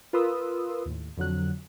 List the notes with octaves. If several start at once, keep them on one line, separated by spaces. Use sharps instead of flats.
F4 A#4 B4 C6 D#6 E6
D#2 A2
F2 D3 F#3 F#6